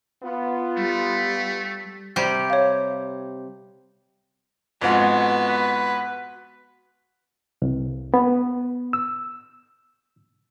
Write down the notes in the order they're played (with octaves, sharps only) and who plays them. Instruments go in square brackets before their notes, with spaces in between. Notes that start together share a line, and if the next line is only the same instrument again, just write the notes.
[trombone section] B3 F4
[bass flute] G3 [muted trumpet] A3
[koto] C3 G3 G4
[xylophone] C#5 F5
[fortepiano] F2 G#2 [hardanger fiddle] B3 F#4
[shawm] B4
[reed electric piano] C2
B3
E6